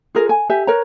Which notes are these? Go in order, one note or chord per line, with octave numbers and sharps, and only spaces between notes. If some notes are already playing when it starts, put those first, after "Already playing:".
F4 G#4 A#4
G#5
G4 E5 G#5
A#4 B4 C#5 A#5